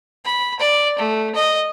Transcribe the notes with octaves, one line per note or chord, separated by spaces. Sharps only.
B5
D5
A3
D#5